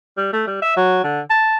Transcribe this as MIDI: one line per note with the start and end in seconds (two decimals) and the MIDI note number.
0.18 0.33 55
0.33 0.44 57
0.47 0.62 55
0.62 0.75 76
0.77 1.00 54
1.04 1.20 50
1.30 1.58 81